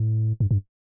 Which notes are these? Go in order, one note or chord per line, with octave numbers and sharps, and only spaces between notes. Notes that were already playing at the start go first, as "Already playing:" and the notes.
Already playing: A2
G2
G2